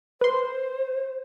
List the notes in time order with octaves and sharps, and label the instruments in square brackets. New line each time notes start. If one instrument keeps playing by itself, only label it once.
[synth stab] B4 C6 [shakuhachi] C5